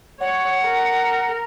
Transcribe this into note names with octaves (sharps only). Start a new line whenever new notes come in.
C#5 F#5
A#4